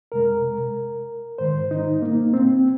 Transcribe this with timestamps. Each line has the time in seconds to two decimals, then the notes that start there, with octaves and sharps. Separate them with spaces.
0.12 F2 C3 G#3 A#4
1.38 G#2 D#3 G#3 C5
1.71 D#4
2.02 A#3
2.34 C4